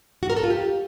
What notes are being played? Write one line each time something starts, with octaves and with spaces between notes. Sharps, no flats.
F#4
A#4
A4
F4
G4